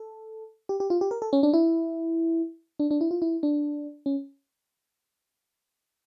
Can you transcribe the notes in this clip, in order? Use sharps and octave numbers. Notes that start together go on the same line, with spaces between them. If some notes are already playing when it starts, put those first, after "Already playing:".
Already playing: A4
G4
G4
F4
G4
A#4
A4
C#4
D4
E4
D4
D4
E4
F4
E4
D4
C#4